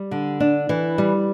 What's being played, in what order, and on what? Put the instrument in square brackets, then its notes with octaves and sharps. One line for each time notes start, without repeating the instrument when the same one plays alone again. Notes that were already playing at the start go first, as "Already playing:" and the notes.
Already playing: [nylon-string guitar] G3
D3
D4
E3
G3